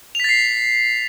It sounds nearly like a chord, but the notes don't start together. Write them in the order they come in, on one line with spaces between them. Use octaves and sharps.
F7 B6 A6 C7